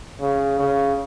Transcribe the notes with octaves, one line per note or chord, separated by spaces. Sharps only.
C#3
C#3